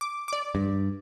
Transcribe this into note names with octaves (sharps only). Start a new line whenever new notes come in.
D6
D5 D6
G2